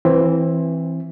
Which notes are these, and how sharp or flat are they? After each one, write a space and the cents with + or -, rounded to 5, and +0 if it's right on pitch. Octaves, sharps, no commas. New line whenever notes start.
E3 +0 C4 +15 E4 +0